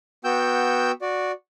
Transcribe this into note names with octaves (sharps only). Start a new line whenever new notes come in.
B3 F#4 G5 E6 G6
F#4 D5